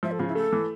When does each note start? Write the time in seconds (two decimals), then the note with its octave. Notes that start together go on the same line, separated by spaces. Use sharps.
0.03 F3 E5
0.12 A4
0.19 C#3 F4
0.28 E4
0.35 A3 A4
0.53 E3